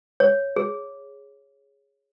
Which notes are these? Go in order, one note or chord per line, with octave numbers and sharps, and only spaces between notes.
C#5
G#4